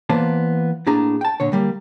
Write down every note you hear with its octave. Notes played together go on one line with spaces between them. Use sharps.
E3 A#3 B3 C5 D5 A5
A2 A#3 D4 G#4 A#5
G5 A5
A#2 D3 C#5
D3 G3 A#3